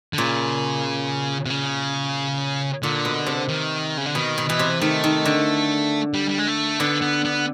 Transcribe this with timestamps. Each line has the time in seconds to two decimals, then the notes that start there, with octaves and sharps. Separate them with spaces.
0.13 D3
0.18 A#2 C#3
1.46 C3
1.50 C#3
2.83 A#2 D3
3.05 B2
3.26 C3
3.48 D#3
3.98 C#3
4.06 D3
4.15 B2 D#3
4.38 B2
4.49 B2 E3
4.59 C3
4.81 D#3 A3
5.04 D#3
5.25 D3
6.14 G3
6.29 G3
6.38 G#3
6.47 A3
6.79 D3 B3
7.01 B3
7.25 B3